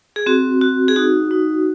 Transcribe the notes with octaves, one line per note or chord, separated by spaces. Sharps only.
G#4
C4 F#4
F#4
G#4
D#4 F#4
D#4